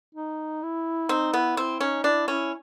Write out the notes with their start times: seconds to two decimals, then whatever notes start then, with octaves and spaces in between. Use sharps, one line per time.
0.15 D#4
0.63 E4
1.09 C4 D#4
1.34 B3 E4
1.57 C4 E4
1.81 C#4 D#4
2.04 D4 E4
2.28 C#4 E4